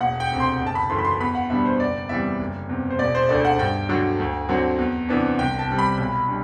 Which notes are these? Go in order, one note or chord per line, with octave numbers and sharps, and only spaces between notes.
E1 F#5
G5
D2 C3
C6
F#1
A5
B5
F#2 E3 A3 C6
B5
C6
E2 B5
F#5
B2 G3 B3 D4 E5
C5
F#1 D5
E2 C3 E3 G3 E5
F#1
E2 C3
C5
E1 D5
C5
D2 D3 A3 D5
F#5
G2 G5
D3 F#3 A3
D2
D3 F#3 C4
E2
C3 E3 B3 D4
C2 G5
A5
C3 G3
B5
B1
G3 D4